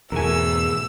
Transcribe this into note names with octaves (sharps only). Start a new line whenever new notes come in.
E2 G#2 B2 A3 A#4 G#5 E6